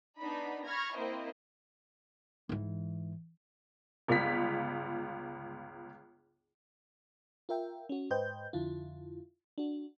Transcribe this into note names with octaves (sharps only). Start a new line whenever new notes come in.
B3 D4 D#4 B5
B5 C#6 F6 G#6 A#6
A#3 C4 E4 A#4 C5 D#5
G#2 E3
G1 C#2 F4 B6
F4 A#4 E5 G5
C#4 F#4
G#2 B4 C5 D#5 G5 G6
F2 D3 E4 F4
D4 F#4